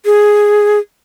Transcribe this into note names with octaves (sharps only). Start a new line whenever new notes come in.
G#4